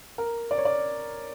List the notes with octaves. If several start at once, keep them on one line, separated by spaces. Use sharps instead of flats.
A#4
D5
C#5
D5